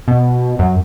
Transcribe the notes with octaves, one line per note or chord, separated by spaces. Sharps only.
B2
F#2